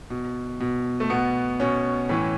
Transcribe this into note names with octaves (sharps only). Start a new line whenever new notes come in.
B2
B2
A3
B2 B3
B2 C#4
A2 E3